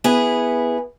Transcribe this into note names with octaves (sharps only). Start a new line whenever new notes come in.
B3 E4 G#4